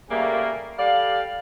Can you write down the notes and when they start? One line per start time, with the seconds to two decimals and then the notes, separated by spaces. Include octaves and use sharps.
0.10 C#3 G3 A3 A#3
0.78 G3 A4 D5 F5